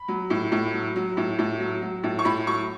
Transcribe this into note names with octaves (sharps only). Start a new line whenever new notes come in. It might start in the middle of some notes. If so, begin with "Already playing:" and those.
Already playing: B5
F#3
A2
A2
F#3
F#3
A2
A2
F#3
F#3
A2
C#6
A2 B5
F#3 C#6